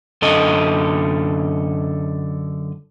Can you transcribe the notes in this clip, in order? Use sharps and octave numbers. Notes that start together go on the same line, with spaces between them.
F#2 D3 A4 D#5